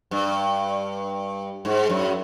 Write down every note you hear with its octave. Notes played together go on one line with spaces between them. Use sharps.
G2
G#2
F#2